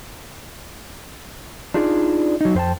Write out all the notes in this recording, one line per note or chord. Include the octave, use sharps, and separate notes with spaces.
D4 D#4 F4 G#4 D5
F#3 D#4
F2 C5 G5 A5